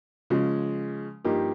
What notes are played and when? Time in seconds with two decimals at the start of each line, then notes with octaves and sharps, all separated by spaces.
0.30 C#3 F3 G#3
1.24 G2 F3 A#3 D#4 G4